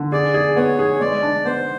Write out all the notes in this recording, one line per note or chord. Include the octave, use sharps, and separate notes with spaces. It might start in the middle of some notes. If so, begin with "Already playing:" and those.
Already playing: D3
G#4 D5
G#4
B3 C#5
G#4
G#3 D5
D4
B3 C5